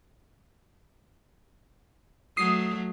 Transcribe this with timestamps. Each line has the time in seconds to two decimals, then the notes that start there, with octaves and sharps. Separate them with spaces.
2.37 F#3 A3 D#6 C7